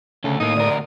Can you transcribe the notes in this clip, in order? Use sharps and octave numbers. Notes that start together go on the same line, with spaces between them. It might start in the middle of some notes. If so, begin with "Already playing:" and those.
D2 C#3 A4
A2 A#3 D#4 D#6
D2 A#4 D5